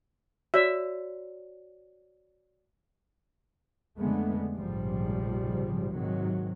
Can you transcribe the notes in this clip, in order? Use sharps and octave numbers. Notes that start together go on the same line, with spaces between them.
F#4 C#5 D5 E5
F2 D3 G#3 A3 B3
F1 A#1 G#2 C#3 F3 G3
G#2 C3 D#3 F#3